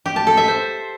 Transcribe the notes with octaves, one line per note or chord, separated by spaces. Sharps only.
G4
A5
A4
E5
C5